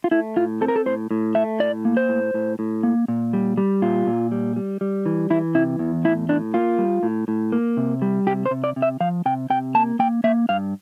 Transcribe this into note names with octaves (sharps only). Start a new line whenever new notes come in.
F4
A3 E4
A2 F4
C4 A4
A#4
A4
A2 C5
A2
A3 E5
A2 D5
A#3
C5
A2
A2
A2
A#3
A#2
G3
G3
A#2 F4
A#2
G3
G3
G3
E3
E3 E4
C3 E4
E2
A2 E4
A2 D4
A#3 F4
G3
A2
A2
A#3
C3
G3
C3 G4
C5
C3
D5
C3
E5
F3 F5
C3 G5
C3 G5
A#3 A5
A#3 G5
A#3 E5
G2 F5